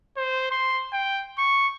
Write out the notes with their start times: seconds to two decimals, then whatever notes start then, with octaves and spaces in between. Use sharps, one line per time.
0.17 C5
0.51 C6
0.92 G5
1.38 C#6